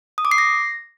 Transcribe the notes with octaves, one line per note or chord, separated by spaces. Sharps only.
D#6
D6
C7
A#6